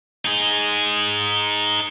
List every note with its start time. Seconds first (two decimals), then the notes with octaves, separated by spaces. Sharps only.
0.25 D#4 G#4